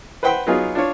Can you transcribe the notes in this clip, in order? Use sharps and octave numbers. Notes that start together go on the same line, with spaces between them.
B4 C5 F#5 G5 B5 C6
F#3 B3 D#4 F4 G#4
D4 F4 C#5